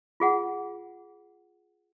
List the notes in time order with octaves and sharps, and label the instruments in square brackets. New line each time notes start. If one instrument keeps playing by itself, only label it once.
[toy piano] F4 G#4 F#5